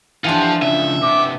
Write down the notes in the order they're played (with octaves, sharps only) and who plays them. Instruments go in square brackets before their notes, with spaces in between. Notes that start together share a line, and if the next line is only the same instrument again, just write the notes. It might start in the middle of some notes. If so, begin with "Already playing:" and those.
[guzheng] E3 D4 [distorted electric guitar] F3 F4 [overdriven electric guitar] G4 F#5
[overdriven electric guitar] C#3 F3 [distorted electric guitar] E5
[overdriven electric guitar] C3 B3 [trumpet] D6